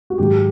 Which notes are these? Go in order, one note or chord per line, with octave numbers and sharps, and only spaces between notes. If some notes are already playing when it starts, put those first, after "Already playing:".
F#4
G#2 D#3 F#3 G4